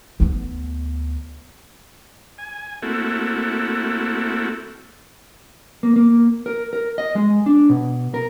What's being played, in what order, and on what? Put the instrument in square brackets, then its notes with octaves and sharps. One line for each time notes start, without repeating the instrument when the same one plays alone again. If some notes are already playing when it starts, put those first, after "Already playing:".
[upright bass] D2 B3
[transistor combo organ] G#5
A3 A#3 C4 E4 F#4 A4
[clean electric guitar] A#3
A#3
A#4
A#4
D#5
G#3
D4
B2
A#4